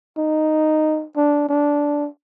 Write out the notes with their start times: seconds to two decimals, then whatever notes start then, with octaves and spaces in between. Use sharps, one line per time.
0.18 D#4
1.16 D4
1.49 D4